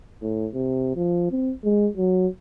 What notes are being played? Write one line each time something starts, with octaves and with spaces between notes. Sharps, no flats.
A2
C3
F3
C4
G#3
F#3